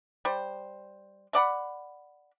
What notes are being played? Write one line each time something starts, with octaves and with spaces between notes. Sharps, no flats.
G3 C5
A3 D5 F#5 B5